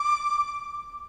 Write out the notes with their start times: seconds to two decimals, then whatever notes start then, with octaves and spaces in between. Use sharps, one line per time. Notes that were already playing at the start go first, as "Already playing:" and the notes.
Already playing: D6